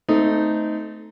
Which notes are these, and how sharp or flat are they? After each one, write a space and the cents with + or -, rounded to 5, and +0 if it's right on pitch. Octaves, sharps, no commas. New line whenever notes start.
A3 +0 C4 -30 D#4 +0